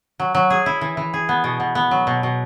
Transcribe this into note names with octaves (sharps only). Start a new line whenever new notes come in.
F#3
F#3
G#4
E4
E3
E3
G#4
B3
B2
B2
B3
F#3
B2
B2